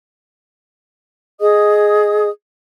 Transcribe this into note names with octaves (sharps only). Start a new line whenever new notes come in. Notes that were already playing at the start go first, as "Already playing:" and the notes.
G#4 D#5 D#6